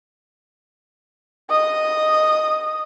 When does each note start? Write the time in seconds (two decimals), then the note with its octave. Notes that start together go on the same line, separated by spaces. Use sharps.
1.50 D#5 D#6